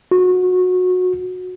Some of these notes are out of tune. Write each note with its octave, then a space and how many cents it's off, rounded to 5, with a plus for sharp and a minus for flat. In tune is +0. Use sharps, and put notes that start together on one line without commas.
F#4 -20